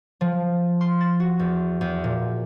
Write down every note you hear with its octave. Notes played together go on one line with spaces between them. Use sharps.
F3
C6
A6
F#4
E2
E2
A#2